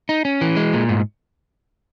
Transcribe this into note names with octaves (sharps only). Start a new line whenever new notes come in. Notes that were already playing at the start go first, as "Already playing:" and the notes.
D#4
C#4
E3
G#3
A#2
G#2